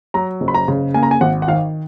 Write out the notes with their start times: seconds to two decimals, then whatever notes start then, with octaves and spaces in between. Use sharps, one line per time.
0.14 F#3 A#5
0.41 F#1
0.48 B5
0.54 A#5
0.68 C#3
0.94 A#3 G#5
1.03 A#5
1.11 G#5
1.21 G#1 F#5
1.42 F#5
1.48 D#3 F5